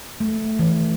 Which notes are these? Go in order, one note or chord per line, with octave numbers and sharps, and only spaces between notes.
A3
E3